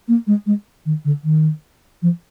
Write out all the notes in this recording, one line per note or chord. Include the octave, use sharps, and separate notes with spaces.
A#3
G#3
G#3
D#3
D3
D#3
F3